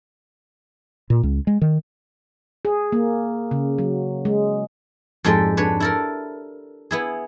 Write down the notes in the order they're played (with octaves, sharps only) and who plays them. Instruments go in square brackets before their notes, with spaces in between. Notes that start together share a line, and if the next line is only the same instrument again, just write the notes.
[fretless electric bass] A#2
C#2
G#3
D#3
[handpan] G#4
A#3
C#3
F#3
G#3
[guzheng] F2 G#2 G#3 G4 A4 D5
D4 B4 C#5
E4 A4 A#4
B3 E4 G#4